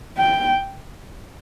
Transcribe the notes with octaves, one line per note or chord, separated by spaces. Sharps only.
G5